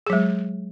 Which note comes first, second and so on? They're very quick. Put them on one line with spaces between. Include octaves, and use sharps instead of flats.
G#4 F#3 G#3